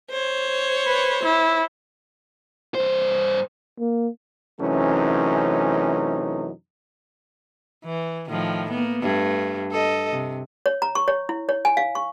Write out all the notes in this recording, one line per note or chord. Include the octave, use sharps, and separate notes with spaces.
C5 C#5
B4
E4
G2 C5
A#3
F#2 C3 E3 A3 C#4 D#4
E3
A2 D#3 F3
A#3 B3
G2 A3
A4 D#5
C3
C#5
A#5
C#6
C#5
E4
C#5
G#5
F5
C#6